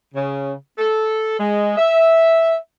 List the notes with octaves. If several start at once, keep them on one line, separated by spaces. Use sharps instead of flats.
C#3
A4
G#3
E5